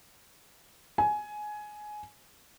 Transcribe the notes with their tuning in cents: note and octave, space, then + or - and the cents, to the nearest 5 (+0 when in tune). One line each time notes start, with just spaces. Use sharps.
G#5 +15